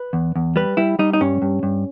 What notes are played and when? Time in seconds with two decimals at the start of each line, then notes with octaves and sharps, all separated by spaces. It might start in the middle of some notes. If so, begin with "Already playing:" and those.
Already playing: B4
0.13 E2
0.36 E2
0.56 G3 B4
0.77 G3 E4
0.99 G3 D#4
1.13 D#4
1.21 G2 C#4
1.42 G2
1.63 G2